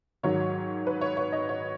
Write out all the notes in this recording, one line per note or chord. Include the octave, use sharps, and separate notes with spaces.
G#2 D#3 F#3 C#5
B4
C#5
C#5
D#5
C#5